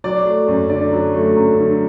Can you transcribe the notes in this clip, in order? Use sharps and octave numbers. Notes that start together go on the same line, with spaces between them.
F#3 D5
A3
F#2
D3 D5
F#3
A3
F#2
D3